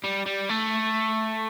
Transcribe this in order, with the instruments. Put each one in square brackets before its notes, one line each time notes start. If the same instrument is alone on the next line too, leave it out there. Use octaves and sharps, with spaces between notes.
[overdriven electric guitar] G3
G3
A3